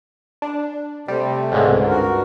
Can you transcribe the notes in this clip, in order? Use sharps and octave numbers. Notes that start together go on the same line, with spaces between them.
D4
C3 G3 A3 C4
C#2 G#2 D3
G2 F#4 A#4